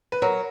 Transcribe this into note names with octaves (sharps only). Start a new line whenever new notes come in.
B4
F#3 A#4